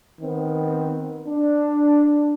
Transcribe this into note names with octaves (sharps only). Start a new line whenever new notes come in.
D#3 B3 C4
D4